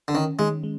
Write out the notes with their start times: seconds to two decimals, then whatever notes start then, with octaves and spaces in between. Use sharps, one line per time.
0.08 D3
0.14 D#3 C#4
0.39 D#3 G#3
0.63 G#3